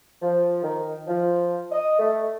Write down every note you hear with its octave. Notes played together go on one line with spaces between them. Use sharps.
F3
D#3
F3
D#5
A3